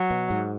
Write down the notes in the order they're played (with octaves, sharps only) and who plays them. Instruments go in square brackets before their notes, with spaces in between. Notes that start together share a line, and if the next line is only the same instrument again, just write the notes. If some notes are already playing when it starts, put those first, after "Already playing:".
Already playing: [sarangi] F#3
[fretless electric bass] B2
G#2